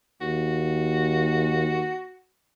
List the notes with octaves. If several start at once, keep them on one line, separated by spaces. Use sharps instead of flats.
D#2 F#4